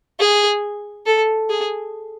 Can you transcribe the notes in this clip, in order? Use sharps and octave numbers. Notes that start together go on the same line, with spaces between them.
G#4
A4
G#4